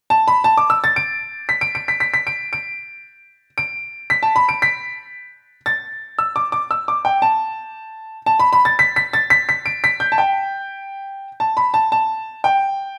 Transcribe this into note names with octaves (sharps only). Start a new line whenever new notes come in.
A5
B5
A5
D6
E6
A6
D7
B6
D7
D7
B6
B6
B6
D7
D7
D7
B6
A5
B5
D7
B6
A6
E6
D6
D6
E6
D6
G5
A5
A5
B5
B5
A6
B6
B6
A6
B6
B6
D7
B6
G6
A5
G5
A5
B5
A5
A5
G5